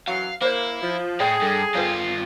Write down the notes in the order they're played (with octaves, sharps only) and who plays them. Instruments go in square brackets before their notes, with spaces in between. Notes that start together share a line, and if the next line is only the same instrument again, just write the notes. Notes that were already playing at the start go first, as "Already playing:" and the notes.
[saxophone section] F#2 E3 F#3 [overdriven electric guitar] F5
[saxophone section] A#3 [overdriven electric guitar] E4 [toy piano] C5 C#5
[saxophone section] F3
[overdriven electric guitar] A2 [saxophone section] G#4 [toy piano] C#5 D5 G5
[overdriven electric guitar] G2 [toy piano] A4
[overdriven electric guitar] G2 F4 [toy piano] B4 C#5